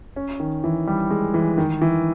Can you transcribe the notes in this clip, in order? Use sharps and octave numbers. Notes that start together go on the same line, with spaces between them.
C#4
D#3
E3
G3
G#3
E3
D#3
E3